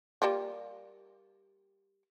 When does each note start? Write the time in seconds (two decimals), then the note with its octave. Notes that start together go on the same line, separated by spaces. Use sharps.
0.22 G3 A#3 F4